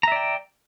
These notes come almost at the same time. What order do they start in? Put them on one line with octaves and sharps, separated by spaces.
A#5 E5 D5 G5